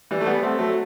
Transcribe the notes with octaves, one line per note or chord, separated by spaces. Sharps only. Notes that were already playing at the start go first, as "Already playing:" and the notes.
E3 G3
A3
G3 B3
A3 C4
F#3 A3